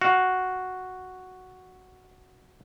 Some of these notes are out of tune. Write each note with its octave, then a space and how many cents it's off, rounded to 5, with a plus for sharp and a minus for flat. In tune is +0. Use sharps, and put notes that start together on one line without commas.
F#4 +0 F5 +10